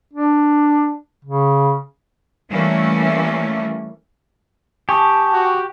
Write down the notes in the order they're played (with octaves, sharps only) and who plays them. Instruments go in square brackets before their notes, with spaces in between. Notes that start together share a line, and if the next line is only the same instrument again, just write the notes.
[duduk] D4
C#3
[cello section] E3 G3 A3 A#3 C#4
[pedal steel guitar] G4 [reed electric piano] G#5 C#6 D#6 [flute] A5
[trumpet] F#4